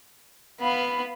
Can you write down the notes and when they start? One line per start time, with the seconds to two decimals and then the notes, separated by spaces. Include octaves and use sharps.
0.61 B3 F5 B5